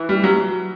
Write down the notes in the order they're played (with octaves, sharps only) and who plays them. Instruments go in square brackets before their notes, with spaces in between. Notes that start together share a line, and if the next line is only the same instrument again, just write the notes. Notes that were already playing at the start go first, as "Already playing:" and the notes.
Already playing: [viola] E3
[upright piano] G3
F#3